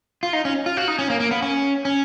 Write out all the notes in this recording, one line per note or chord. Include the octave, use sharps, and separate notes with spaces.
F4
D#4
C#4
F4
F#4
D#4
C#4
A#3
A#3
B3
C#4
C#4